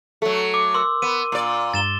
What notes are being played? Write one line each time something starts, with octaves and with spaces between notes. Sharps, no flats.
F#3 A3 A4
D6
A#4 C6 E6
B3 D#7
A#2 D5
G2 A6 E7 G7